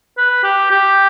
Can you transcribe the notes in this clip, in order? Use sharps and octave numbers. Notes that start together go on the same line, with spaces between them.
B4
G4
G4